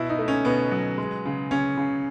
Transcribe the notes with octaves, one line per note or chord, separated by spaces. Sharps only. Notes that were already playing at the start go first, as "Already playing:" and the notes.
Already playing: B2 E4
D#4
A3
C#4
B2 B3
F#3
G#3
C#3
C#3 C#4
C#3